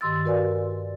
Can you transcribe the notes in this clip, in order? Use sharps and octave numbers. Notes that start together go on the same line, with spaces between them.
G2 D#3 C6 E6 A6
F#4 A#4 B4 D5 F5 G#5